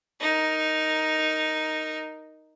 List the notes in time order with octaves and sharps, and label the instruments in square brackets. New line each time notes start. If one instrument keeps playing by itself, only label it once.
[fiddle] D#4 A#4